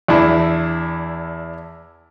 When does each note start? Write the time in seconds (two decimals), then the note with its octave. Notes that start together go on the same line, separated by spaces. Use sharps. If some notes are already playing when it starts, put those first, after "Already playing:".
0.08 E2 D4 E4